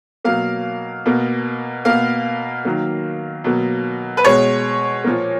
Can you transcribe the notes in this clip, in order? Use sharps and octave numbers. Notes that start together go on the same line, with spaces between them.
B2 F#3 A#3 F5
B2 A#3
B2 A#3 F5
D#3 F#3 A#3
B2 F#3 A#3
B4
B2 G#3 C#5
A#2 F3 A#3